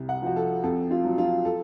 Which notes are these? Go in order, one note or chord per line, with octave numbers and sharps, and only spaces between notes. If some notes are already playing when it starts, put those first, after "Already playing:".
Already playing: C2
F#5
F3 F#4
A4
F2 A4
F4
F#3
F4
A4